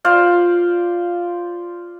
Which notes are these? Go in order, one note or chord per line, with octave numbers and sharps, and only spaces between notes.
F4 C5 D5 F5